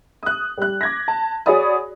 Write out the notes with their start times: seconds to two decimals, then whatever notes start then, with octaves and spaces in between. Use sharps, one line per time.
0.23 D#6 F#6
0.58 G3 F#6
0.81 D6 G#6 A#6
1.08 A5
1.46 F#4 G#4 C#5 D5 B5 D#6